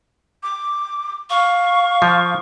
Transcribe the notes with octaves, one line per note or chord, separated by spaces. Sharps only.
D6
F5 C#6
F3